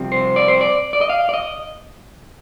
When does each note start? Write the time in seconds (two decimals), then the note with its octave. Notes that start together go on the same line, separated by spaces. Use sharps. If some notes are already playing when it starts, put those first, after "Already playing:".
Already playing: C2 C3 F3 C4
0.12 C5
0.36 D5
0.48 C5
0.61 D5
0.93 D5
1.01 D#5
1.10 F5
1.29 D5
1.34 D#5